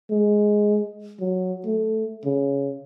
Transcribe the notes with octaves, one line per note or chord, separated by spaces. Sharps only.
G#3
F#3
A3
C#3